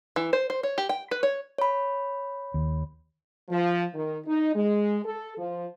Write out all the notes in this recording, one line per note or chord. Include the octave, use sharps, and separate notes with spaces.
E3
C5
C5
C#5
G4
G5
B4
C#5
C#5 B5
D#2
F3
D#3
D#4
G#3
A4
F3